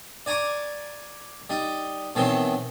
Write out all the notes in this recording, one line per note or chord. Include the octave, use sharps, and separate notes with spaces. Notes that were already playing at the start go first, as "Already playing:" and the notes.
D5 G#5 A#5 C#6 D6
G3 D#4
B2 D#3 E3 F#3 C4